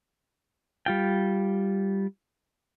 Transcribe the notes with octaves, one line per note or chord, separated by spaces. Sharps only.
G3 F4 G5